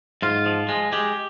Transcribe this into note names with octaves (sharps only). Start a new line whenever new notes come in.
G#2 F4
F3
G#3
G#3 G4